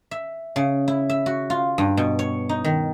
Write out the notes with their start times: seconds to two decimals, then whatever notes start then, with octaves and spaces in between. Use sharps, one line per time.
0.11 E5
0.56 C#3
0.88 E4
1.09 E5
1.26 F#4
1.50 F4
1.78 G2
1.97 B2
2.19 C#5
2.49 D#4
2.64 D#3